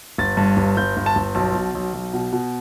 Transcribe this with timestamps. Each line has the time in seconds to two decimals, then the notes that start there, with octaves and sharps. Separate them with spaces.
0.18 G1 A6
0.37 G2
0.57 G1
0.77 G1 G6
0.97 G1
1.06 A5
1.16 G1
1.35 B1 A5
1.55 B2
1.75 B1
1.93 B1
2.14 B2
2.33 B2